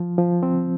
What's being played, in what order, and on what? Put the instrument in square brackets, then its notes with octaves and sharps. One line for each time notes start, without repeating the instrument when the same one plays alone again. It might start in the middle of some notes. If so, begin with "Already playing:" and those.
Already playing: [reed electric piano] F3
F3
C4